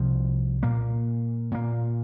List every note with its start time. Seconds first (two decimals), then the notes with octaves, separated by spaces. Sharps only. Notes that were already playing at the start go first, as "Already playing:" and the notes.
Already playing: C2 C3 F3
0.63 A#2 A#3
1.52 A#2 A#3